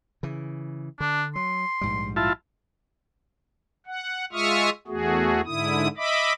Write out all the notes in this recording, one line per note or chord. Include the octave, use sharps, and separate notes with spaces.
C#3 E3
D3 D4
F#3 C6
A#1 G#2 G3
E4 F4 A5
F#5
G#3 F4 E5 C#6 D#6 F6
E2 A3 F#4 G#4
G#2 D3 E4 D#6
D#5 E5 B5 D6